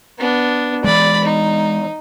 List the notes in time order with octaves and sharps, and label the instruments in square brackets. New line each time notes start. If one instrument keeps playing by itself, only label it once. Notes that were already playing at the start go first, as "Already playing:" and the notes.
[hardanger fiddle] B3 D4
[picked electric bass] E3 G#3 [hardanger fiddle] D5 B5
[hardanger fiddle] D#4